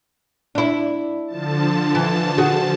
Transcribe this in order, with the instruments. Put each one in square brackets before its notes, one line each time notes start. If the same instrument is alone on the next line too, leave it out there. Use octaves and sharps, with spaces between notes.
[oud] D4 E4
[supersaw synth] D3 F3 A5
[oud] E3
F#4 G#4